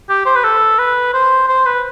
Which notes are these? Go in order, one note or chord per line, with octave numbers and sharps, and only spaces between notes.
G4
C5
B4
A4
B4
C5
C5
B4